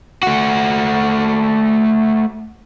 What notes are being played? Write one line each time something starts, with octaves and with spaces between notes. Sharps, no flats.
A3 F#4